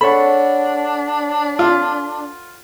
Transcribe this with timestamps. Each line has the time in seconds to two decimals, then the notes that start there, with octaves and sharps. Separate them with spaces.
0.01 D4 A4 C#5 F#5 B5
1.59 F4